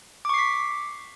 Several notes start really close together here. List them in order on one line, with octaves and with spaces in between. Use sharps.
D6 C#6 C7 B6